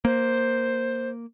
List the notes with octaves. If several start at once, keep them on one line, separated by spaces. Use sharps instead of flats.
A#3 C5